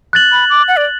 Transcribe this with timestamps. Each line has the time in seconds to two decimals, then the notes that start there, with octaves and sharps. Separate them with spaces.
0.13 F#6 A6 F#7
0.32 B5
0.50 D6
0.68 F#5
0.77 D5